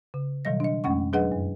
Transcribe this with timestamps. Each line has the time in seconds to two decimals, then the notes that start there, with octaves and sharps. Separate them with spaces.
0.14 C#3
0.45 B2 D#3 F#3 G3 D#5 A#6
0.60 D4 D#5
0.84 F2 G#3 A3 C#4 F#5 C#6
1.13 F#3 D4 G#4 B4 D#5 F#5
1.32 F#2